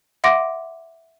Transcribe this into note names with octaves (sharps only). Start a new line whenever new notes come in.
E5 F#5 C6 D6 A#6 D7